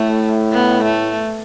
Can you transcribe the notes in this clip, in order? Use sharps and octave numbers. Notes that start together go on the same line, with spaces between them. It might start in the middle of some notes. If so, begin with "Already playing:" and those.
Already playing: A2 A3
B3
A3